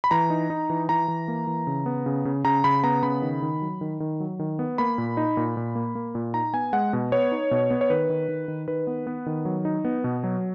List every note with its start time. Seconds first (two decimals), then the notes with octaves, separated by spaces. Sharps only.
0.04 B5
0.11 E3 A#5
0.30 D#4
0.50 D#4
0.70 E3
0.89 E3 A#5
1.08 E3
1.28 A#3
1.47 E3
1.67 C#3
1.86 B3
2.06 C#3
2.25 C#3
2.45 C#3 A#5
2.64 C#3 B5
2.84 B3 A#5
3.03 C#3 B5
3.22 D#3
3.42 D#3
3.62 F#3
3.81 D#3
4.00 D#3
4.20 F#3
4.39 D#3
4.59 B3
4.78 A#3 B5
4.98 A#2
5.17 D#4
5.37 A#2
5.57 A#2
5.75 A#3
5.95 A#3
6.15 A#2
6.34 D#4 A#5
6.53 B3 G#5
6.73 G#3 F#5
6.93 B2
7.12 B3 C#5
7.32 D#4
7.51 B2
7.71 B3
7.81 C#5
7.90 D#3 B4
8.10 D#3
8.29 D#3
8.48 D#3
8.68 D#3 B4
8.87 B3
9.07 B3
9.26 D#3
9.45 F#3
9.65 D#4
9.85 B3
10.04 B2
10.24 F#3